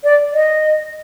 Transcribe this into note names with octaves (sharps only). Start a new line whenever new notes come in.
D5
D#5